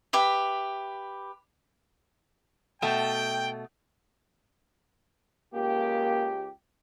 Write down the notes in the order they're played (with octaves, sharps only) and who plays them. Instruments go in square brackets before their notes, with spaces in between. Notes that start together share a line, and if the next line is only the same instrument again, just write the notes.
[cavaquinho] G4 B4 E5
[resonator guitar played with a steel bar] B2 A3 [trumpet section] G5
[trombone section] C#2 G4 [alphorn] A#3